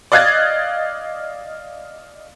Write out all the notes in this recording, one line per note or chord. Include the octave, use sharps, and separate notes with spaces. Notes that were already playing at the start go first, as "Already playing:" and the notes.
D5 D#5 F5 F#6 G#6 A6